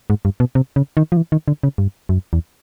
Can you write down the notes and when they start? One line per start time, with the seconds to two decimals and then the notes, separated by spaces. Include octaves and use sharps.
0.10 G#2
0.25 G2
0.40 B2
0.55 C3
0.76 C#3
0.97 D#3
1.12 F3
1.17 E3
1.32 D#3
1.48 D3
1.63 C#3
1.78 G2
2.09 F#2
2.33 E2